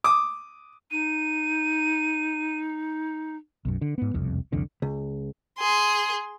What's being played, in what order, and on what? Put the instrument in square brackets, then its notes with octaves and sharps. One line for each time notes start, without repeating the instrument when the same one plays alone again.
[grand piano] D6 D#6
[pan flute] D#4 [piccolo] D#7
[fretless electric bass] B1 F#2
D3
G#2 B3
E1 C2 F2
C2 F2 D3
[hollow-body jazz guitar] C#2
[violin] G#4 C6